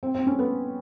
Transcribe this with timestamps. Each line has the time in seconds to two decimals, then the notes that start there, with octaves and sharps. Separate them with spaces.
0.03 C4
0.15 C4
0.27 C#4
0.39 B3